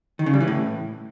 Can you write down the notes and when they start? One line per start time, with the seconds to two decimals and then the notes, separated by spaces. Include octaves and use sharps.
0.19 D#3
0.26 C#3
0.33 G3
0.40 E3
0.48 A2